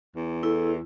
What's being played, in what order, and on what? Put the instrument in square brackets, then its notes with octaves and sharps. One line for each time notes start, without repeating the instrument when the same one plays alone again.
[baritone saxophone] E2
[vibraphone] E4 [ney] A4